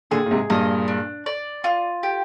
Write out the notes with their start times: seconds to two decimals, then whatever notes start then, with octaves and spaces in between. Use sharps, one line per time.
0.11 A#2 D3 G#4
0.26 A#2
0.31 G#2 C3
0.50 G2 A#2 D#5
0.88 D4
1.26 D5
1.64 F4
2.03 G4